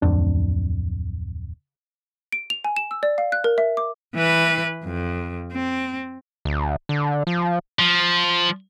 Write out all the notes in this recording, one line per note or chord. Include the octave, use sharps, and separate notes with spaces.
D1 F2 D4
D7
F7
G#5
E7
E6
D5
F5
F#6
A#4
E5
D6
E3 B4
F2
C4
D2
D3
F3
F3